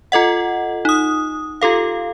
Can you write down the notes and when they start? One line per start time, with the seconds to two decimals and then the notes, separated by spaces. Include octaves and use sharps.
0.12 F4 A4 D#5 F#5
0.85 D#4 D#6
1.61 F4 G4 A4 F5